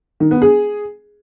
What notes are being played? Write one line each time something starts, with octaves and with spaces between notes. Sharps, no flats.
D#3
B3
G#4